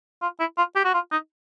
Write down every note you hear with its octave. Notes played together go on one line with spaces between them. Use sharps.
F4
E4
F4
G4
F#4
F4
D#4